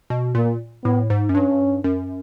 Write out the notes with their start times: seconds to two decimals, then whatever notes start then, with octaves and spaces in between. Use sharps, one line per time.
0.10 B2
0.35 A#2 A#3
0.84 A2 B3
1.10 G#2
1.29 F#2
1.35 G2 C#4
1.84 F#2